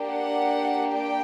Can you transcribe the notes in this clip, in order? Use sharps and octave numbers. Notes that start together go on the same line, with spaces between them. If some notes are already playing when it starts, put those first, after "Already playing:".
Already playing: A#3 D4 G4
F#5
G5